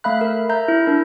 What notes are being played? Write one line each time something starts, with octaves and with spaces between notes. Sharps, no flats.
A3 E5 F5 B5 F#6
A#4
E5 A#5 G6
E4
D4 A#4